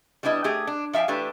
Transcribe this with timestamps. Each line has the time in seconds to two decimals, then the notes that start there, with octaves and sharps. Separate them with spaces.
0.23 G3 B3 D4 E4 D#5
0.44 A3 G4 G#4
0.67 D4
0.93 F3 E5 F5 G5 G#5
1.08 E3 A3 D4 G4 B4